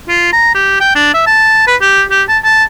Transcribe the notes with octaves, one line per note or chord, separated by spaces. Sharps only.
F4
A#5
G4
G5
D4
E5
A5
B4
G4
G4
A5
A5